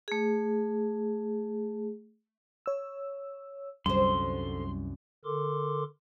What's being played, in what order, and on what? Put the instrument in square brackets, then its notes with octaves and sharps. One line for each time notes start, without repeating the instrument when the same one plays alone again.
[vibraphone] A3 G#4
[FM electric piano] C#5 E6
[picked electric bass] C2 F#2 [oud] D3 C5 [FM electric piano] G3 [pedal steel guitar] C6
[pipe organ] D3 A4 A#4 C6 D6